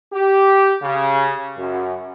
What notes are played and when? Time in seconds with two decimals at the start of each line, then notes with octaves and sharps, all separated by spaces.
0.13 G4
0.83 C#3
1.58 F#2